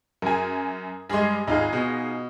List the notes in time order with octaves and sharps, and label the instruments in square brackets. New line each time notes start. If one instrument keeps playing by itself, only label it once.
[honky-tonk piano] F#2 G#5 [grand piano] G#4 A#4
[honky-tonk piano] G2 G#3 [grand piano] G#4 C6
[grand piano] G#1 [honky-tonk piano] D#4 F4 G#4
[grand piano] B2